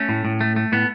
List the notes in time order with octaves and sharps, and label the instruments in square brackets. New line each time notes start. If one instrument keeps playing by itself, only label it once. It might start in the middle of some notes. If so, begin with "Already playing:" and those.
Already playing: [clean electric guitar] A3 C#4
A2
A2
A3
A3
A2 B3